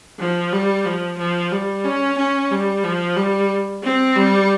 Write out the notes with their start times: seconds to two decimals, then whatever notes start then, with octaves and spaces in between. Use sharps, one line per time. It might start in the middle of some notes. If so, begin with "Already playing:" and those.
0.19 F3
0.52 G3
0.85 F3
1.18 F3
1.52 G3
1.84 C#4
2.18 C#4
2.51 G3
2.84 F3
3.16 G3
3.83 C4
4.16 G3